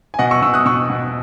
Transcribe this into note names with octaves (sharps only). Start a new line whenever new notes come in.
G#5
B2 D#5 F#5
C#6 E6
B2 C#6 E6
D#6 F#6
B2 C#6 E6
B2